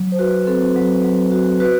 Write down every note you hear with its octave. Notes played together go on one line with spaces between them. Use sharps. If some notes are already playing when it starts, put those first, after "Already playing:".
Already playing: F#3
C5
F#4 B4
C4 A4
F#3
F#3
F#4
F#4 B4